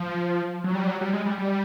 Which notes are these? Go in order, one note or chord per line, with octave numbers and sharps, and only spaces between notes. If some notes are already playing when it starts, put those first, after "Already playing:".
Already playing: F3
F#3
G3
F#3
G3
G#3
G3
G3